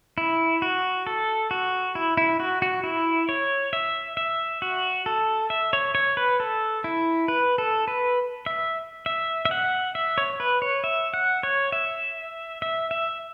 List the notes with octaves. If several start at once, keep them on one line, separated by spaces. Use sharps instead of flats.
E4
F#4
A4
F#4
E4
E4
F#4
F#4
E4
C#5
E5
E5
F#4
A4
E5
C#5
C#5
B4
A4
E4
B4
A4
B4
E5
E5
E5
F#5
E5
C#5
B4
C#5
E5
F#5
C#5
E5
E5
E5